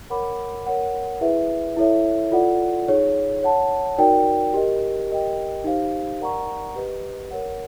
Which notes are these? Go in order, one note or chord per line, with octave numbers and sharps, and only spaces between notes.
A#4 C#5 F#5 B5 D6
A#4 C#5 F#5
E4 G#4 B4 E5
E4 A4 C#5 E5
F4 A4 D5 F#5
D#4 G#4 C#5
C#5 F#5 A5
D#4 F#4 A#4 D5 G5
G4 A#4 D#5
G4 A#4 D#5 G5
D#4 G4 C5 F5
A#4 D5 F#5 A#5 C#6
G4 B4 D#5
A#4 C#5 F#5